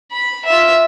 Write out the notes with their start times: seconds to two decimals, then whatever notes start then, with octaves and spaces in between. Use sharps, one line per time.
0.12 B5
0.45 F4 E5